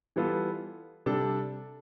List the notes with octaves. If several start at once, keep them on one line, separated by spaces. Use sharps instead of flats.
E3 G3 B3 F4 A4
C3 G3 D4 A4